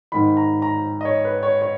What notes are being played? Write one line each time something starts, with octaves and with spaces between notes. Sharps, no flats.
G#2 D#3 B5
A#5
A#5
D#5
C#5
B4
C#5
C#5